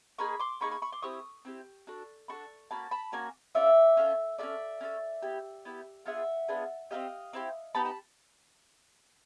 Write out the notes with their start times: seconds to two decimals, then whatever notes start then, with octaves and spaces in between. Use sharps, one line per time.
0.18 A#3 D#4 G#4 B5 C#6
0.40 C6 D6
0.61 A#3 D#4 G#4 B5 C#6
0.71 B5 C#6
0.82 B5 C#6
0.92 C6 D6
1.02 C4 E4 G4 C#6 D#6
1.45 C4 E4 G4
1.87 D4 F#4 A4
2.28 D4 F#4 A4 B5 C#6
2.71 A#3 C#4 F#4 A5 B5
2.91 A5 B5
3.12 A#3 C#4 F#4 G#5 A#5
3.55 C#4 F4 A4 D5 E5
3.97 C#4 F4 A4
4.38 F4 A4 D5 E5
4.43 C#4
4.81 C#4 F4 A4
5.22 B3 E4 G4
5.65 B3 E4 G4
6.06 B3 D4 F4 G#4 E5 F#5
6.48 B3 D4 F4 G#4
6.91 C4 E4 G4 D#5 F5
7.33 C4 E4 G4
7.75 B3 D#4 G4 A5 B5
7.85 A5 B5